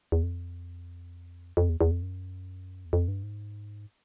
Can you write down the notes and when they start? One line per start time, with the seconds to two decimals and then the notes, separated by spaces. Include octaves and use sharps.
0.12 E2
0.23 F2
1.57 F2
1.69 E2
1.81 E2
1.91 F2
2.02 F#2
2.85 E2
2.93 F2
3.08 G2
3.23 G#2